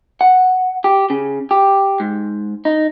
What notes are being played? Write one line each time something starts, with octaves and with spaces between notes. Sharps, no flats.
F#5
G4
C#3
G4
G#2
D#4